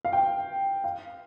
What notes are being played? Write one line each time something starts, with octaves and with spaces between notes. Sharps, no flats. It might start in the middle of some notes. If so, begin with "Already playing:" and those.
F5
G5
F5